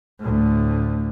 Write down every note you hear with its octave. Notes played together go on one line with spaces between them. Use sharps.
D2 A2